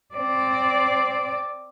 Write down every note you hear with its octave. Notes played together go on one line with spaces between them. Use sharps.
C4 D5